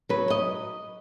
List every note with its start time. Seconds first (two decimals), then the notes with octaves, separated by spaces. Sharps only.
0.09 F#3 B4
0.30 D#5